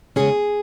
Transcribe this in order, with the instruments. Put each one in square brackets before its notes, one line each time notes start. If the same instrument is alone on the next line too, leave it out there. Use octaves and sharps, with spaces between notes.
[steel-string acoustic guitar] E2 C#3 G#3 C#4 G#4